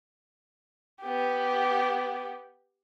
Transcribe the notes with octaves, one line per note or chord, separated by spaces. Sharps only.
B3 G4